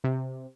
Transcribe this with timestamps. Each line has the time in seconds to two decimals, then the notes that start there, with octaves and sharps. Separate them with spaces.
0.04 C3